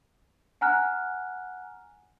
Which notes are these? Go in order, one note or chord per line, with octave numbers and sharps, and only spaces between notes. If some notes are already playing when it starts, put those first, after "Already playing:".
F#5 G#5 A#5 F6 F#6